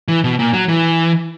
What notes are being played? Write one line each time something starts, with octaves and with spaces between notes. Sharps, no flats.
E3
B2
A#2
F#3
E3